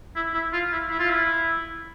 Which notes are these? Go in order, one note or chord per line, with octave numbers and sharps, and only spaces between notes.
E4
E4
F4
E4
E4
F4
E4